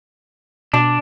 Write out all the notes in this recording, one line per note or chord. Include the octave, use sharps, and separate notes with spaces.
B2 D4